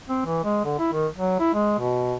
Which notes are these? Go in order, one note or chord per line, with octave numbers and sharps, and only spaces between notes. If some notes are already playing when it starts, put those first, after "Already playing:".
C4
E3
G#3
D3
E4
D#3
F#3
E4
G#3
B2